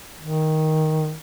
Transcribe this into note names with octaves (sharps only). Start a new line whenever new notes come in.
D#3